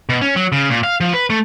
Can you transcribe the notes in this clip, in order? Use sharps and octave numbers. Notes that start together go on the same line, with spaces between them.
B2
C#4
F#3
C#3
A#2
F5
F3
B4
A3